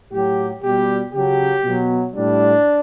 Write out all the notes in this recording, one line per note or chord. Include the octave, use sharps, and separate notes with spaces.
A2 F#3 G4
B2 G3 G4
C#3 F#3 G4
B2 F#3
A2 G3 D4